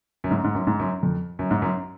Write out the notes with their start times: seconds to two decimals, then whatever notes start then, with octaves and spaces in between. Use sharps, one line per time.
0.24 F#2
0.31 G#2
0.44 G#2
0.55 F#2
0.67 G#2
0.79 F#2
1.03 F2
1.39 F#2
1.51 G#2
1.62 F#2